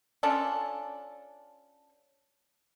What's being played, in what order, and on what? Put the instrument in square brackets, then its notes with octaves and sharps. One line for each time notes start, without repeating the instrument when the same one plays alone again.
[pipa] C#4 D4 F4 A4